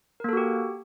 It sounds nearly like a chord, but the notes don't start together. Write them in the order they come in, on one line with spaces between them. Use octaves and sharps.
A#4 A#3 A4 F#4 G4